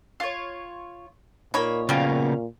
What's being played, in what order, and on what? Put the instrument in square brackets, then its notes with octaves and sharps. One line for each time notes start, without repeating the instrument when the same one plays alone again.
[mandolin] F4 C#5
[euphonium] A#2 [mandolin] A#3 B5 [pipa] D#4 C#5
[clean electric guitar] C#3 A#3 B3 [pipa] F3 G3 [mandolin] C#4 F5